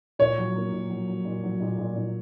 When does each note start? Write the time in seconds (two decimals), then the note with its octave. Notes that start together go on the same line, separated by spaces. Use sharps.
0.19 A#2 C#5
0.38 F#3
0.56 A#3
0.72 A#2
0.90 F#3
1.08 F#3
1.25 A#2
1.43 F#3
1.61 A#2
1.78 A#2
1.96 A#2